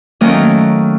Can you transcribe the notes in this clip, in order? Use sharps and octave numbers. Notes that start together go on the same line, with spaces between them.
D#3 F#3 A3 A#3 C#4 A#4